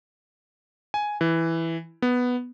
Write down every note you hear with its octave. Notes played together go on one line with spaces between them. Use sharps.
G#5
E3
B3